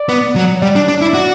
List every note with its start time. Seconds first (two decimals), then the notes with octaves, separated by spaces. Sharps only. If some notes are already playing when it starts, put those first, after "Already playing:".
Already playing: D5
0.09 B3
0.36 F#3
0.62 G3 D5
0.75 D4
0.88 D4
1.01 E4
1.14 F#4